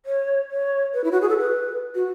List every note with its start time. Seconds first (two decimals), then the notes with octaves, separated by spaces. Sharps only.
0.06 C#5
0.51 C#5
0.94 B4
1.04 E4
1.12 F#4
1.21 G#4
1.29 A4
1.39 B4
1.95 F#4